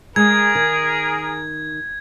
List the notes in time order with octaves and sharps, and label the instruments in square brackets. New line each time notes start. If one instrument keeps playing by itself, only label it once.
[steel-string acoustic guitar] G#3 [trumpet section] G#4 A#4 [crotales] G#6
[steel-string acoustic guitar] D#3